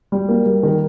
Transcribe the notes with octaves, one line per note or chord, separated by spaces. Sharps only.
G3
A#3
G3
D#3